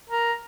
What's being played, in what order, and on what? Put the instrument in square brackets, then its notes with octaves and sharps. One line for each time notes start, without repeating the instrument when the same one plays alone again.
[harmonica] A#4